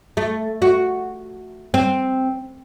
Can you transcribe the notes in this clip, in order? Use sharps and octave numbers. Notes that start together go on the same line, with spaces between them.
A3
F#4
C4